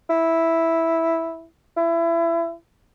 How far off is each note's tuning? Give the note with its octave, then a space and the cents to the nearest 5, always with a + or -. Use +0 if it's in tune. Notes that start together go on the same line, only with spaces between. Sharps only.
E4 -5
E4 +25